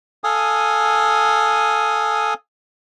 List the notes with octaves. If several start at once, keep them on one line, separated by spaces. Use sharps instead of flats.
A4 F5 G#5 D#6